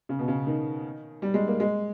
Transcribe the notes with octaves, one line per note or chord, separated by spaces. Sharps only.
C#3
B2
C#3
D#3
G3
G#3
A#3
G#3